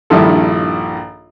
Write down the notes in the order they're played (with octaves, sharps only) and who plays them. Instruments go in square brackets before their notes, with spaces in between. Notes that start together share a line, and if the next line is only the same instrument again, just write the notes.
[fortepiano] A#1 G2 D#3 E4 F4 A4